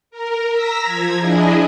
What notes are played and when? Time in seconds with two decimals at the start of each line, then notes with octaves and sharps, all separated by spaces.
0.11 A#4
0.51 A#5 E6 A#6 B6
0.82 F3 G#6
1.18 D4 E4 G#4 D#5